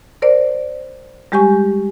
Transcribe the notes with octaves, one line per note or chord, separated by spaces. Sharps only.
A#4 C5 D5
G3 G#3 G4 G#5 C#6